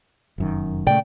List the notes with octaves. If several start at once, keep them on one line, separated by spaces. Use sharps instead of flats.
F1 F#2 D#3
A#2 C#3 A3 D5 G5